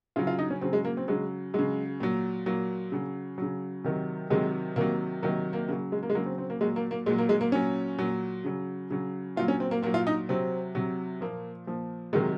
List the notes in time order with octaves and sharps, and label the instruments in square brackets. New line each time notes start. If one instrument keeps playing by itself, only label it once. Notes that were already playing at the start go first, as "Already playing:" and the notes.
[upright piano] C#3 F#3 F4
F4
D#4
C#4
C#3 F#3 C4
G#3
A#3
C4
C#3 F#3 G#3
C#3 F#3 G#3
A#2 F#3
A#2 F#3 A#3
C#3 F#3
C#3 F#3
C3 D#3 F#3
C3 D#3 F#3 G#3
C3 D#3 F#3 A#3
C3 D#3 F#3 A#3
A#3
C#3 F#3 A#3
G#3
A#3
G#3
C#3 F#3 A#3
C4
C4
A#3
A#2 F#3 G#3
A#3
A#3
A#2 G#3
F#3
A#3
G#3
A#3
A#2 F#3 C#4
A#2 F#3
C#3 F#3
C#3 F#3
A#2 F#3 F4
C#4
C4
A#3
A#2 A#3
F#3
F4
D#4
C3 F#3 C4
C3 F#3
A#2 F3 A#3
A#2 F3
C3 D#3 F#3 G#3